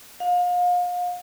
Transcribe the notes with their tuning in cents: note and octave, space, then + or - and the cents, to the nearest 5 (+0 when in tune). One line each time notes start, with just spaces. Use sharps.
F5 +35